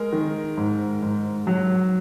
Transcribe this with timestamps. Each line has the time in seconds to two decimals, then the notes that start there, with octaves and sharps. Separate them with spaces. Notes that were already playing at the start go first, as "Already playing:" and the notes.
Already playing: G#3 A#4
0.13 D#3
0.57 G#2
1.03 G#2
1.47 F#3